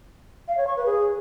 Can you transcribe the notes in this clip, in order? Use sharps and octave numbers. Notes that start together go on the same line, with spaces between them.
F5
C#5
C#6
B4
G#4